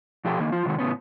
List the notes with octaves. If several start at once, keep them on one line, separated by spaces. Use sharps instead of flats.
B2 F3 G4 A4 G5
D3 D#3 A#3
F3 F4
C3 D#3 G#3 F#4
A2 C#3 B3 C#4